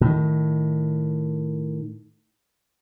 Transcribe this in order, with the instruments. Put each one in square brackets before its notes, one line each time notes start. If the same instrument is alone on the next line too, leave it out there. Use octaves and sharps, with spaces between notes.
[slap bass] A2 D#3